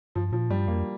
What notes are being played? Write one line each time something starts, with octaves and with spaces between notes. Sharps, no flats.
G2 F3
A#2 F3
G2 G3
F2 A#3